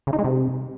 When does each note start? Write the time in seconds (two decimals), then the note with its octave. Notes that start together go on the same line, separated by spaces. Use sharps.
0.07 C#3
0.13 D#4
0.19 G#3
0.24 C3